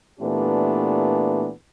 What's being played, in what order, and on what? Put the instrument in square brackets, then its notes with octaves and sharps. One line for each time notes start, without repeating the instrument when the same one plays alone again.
[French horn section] A#2 E3 A3 B3 D4 G4